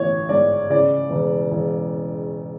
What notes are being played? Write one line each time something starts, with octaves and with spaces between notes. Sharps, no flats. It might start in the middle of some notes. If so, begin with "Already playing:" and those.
Already playing: A1 C#5
G#2 D5
C#3 D5
E1
E1